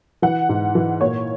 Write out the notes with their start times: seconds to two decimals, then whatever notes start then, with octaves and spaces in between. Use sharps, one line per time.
0.22 E3 F#5
0.49 G#2
0.75 E3
1.01 A#2 C#5